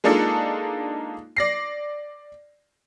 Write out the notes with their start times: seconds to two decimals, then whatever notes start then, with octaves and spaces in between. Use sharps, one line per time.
0.04 G#3 A#3 D4 D#4 F4 A4
1.37 D5 A#6 C7